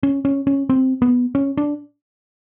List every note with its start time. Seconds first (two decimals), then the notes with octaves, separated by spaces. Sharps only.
0.03 C#4
0.25 C#4
0.47 C#4
0.69 C4
1.02 B3
1.35 C#4
1.57 D4